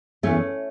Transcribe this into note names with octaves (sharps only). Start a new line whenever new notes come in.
E2 E3 A3 C#4